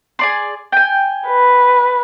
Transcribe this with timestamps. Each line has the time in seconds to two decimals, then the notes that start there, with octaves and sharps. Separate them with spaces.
0.19 G#4 D5 C6
0.72 G5 G#5
1.27 B4